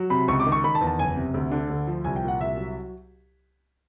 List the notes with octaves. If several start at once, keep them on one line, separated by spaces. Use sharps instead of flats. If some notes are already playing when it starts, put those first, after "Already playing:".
Already playing: F#3
C3 B5
C#2 C#6
D6
D#3
C#6
D#3 B5
A5
E2
A5
F#1 G#5
C3
D2
D3
D2
F3
C2 G#5
G5
A#2 F#5
C2 E5
F#3